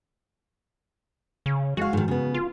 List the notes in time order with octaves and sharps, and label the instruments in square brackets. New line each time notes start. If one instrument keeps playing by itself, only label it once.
[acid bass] C#3
[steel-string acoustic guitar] G#3 F5 [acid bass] F#4
[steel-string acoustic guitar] G#2 D#3
C#3 B3
[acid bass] F4